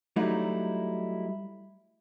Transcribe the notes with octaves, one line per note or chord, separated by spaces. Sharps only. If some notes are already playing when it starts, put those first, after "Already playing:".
F#3 G3 A3 D#4 E4 F#4